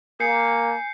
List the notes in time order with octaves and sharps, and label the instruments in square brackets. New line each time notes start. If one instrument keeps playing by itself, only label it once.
[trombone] A#3 [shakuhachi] G#5 [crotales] G6 C7 C#7